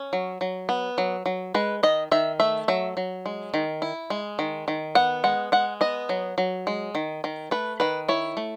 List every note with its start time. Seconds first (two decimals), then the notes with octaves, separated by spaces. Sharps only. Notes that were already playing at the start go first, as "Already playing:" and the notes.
Already playing: C#4
0.13 F#3
0.41 F#3
0.69 B3
0.98 F#3
1.26 F#3
1.54 G#3 B4
1.83 D#3 D#5
2.11 D#3 E5
2.40 A3 E5
2.68 F#3 E5
2.97 F#3
3.26 G#3
3.54 D#3
3.82 E4
4.10 G#3
4.39 D#3
4.68 D#3
4.95 B3 F#5
5.24 G#3 F#5
5.52 G#3 F#5
5.81 B3 D#5
6.09 F#3
6.38 F#3
6.67 G#3
6.95 D#3
7.24 D#3
7.51 A3 B4
7.80 D#3 B4
8.08 E4 C#5
8.37 A3